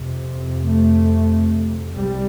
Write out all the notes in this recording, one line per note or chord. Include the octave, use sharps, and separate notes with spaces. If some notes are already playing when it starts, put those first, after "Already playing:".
Already playing: F2 C3
A3
C2 C3 G3